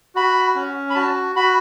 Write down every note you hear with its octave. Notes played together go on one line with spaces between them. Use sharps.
F#4 B5
C#4
B5
F#4 A5
F#4 B5